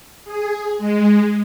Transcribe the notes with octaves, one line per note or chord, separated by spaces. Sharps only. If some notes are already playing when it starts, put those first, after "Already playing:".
G#4
G#3